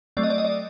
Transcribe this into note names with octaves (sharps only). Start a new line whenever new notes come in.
F#3 A3 C4 D5
D#5
D5
D#5
D5